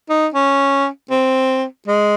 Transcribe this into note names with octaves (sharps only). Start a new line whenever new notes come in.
D#4
C#4
C4
G#3